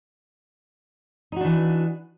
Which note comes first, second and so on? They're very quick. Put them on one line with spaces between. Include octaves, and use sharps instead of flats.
D#4 F#4 D4 E3